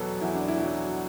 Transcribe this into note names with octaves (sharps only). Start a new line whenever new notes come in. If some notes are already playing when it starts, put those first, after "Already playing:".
Already playing: E2 B2 F#3 A4 B4
E2 E4
D4
E4
B2 F#3